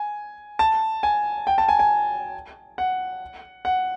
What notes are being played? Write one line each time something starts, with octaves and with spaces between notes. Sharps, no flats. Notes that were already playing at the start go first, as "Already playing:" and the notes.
Already playing: G#5
A5
G#5
G5
A5
G#5
G#5
F#5
F#5